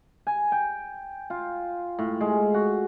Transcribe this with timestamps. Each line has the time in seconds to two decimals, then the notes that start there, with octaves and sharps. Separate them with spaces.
0.27 G#5
0.52 G5
1.30 F4
1.99 A2
2.21 G#3
2.54 F#4